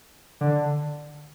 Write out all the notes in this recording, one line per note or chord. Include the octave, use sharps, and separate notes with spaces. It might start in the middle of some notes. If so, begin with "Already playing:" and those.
D3